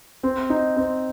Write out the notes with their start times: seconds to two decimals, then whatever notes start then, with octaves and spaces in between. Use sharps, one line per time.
0.23 C4
0.50 D#4
0.76 C4